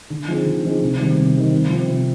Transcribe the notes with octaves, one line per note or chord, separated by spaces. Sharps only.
D3
F3 C4 D#4 G#4
D3
F3 C4 D#4 G#4
C3
D#3 G3 C4
C3
D#3 G3 C4
C3
F3 C4
C3